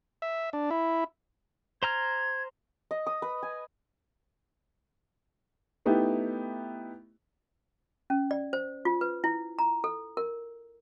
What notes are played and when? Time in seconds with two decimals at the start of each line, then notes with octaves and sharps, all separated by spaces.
0.22 E5
0.53 D4
0.71 E4
1.83 C5 A#5 F6 G#6
2.91 D#5
3.07 D#6
3.22 B4
3.43 G#5
5.86 A3 B3 D#4 E4 G4
8.10 C#4
8.31 D5
8.53 C5
8.85 F4
9.01 B4
9.24 E4
9.59 A#5
9.84 A4
10.17 A#4